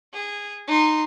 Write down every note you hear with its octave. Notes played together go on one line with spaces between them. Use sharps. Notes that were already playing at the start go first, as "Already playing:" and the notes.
G#4
D#4 C6